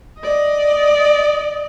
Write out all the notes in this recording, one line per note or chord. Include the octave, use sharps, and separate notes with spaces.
D5 D#5